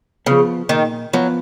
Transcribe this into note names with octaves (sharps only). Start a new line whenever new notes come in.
C#3 F3 B3
A#2 D#3
F3 F#3 B3